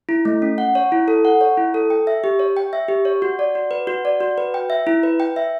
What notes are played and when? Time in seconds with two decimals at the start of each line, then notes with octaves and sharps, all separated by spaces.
0.09 E4
0.25 A3
0.42 C#4
0.58 F#5
0.75 C#5
0.92 E4
1.08 A4
1.25 F#5
1.41 C#5
1.57 E4
1.74 A4
1.90 G5
2.07 E5
2.24 G4
2.39 C#5
2.57 G5
2.73 E5
2.88 G4
3.05 C#5
3.22 F#4
3.39 D5
3.55 F#4
3.71 B4
3.87 F#4
4.05 D5
4.20 F#4
4.38 B4
4.54 G5
4.70 E5
4.87 E4
5.03 B4
5.20 G5
5.36 E5